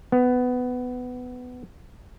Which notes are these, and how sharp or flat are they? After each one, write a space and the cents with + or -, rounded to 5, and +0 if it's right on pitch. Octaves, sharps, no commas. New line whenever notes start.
B3 +15